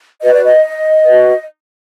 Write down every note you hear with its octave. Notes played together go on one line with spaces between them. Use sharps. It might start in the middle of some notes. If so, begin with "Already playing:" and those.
F#4 B4 D#5
D5
D#5
F#4 B4